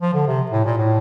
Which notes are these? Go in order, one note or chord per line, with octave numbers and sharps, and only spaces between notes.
F3
D3
C3
A2
A#2
A2